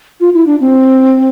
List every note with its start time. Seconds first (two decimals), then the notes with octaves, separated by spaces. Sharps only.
0.21 F4
0.34 E4
0.47 D4
0.60 C4